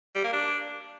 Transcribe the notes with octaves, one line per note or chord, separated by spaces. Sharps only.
G3
A#3
D4